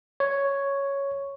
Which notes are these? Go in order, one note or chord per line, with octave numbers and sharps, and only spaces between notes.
C#5